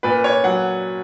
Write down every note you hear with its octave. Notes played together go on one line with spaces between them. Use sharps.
A#2 B4
C#5
F#3 F#5